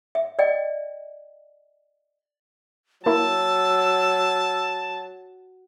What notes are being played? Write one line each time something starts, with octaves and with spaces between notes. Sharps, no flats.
E5
D5 D#5 G5
F#3 A#3 E4 A5 E6